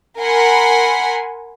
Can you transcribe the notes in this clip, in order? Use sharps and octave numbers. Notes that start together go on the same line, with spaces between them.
A#4 F#5 G#5 B5 C6 B6